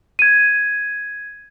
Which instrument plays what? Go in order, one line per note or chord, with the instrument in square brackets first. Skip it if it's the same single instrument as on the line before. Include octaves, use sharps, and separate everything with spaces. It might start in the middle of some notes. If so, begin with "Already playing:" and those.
[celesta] G#6 D#7